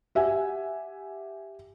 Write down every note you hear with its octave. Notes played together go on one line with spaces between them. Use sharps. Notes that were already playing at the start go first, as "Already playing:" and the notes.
G4 E5 F#5 G#5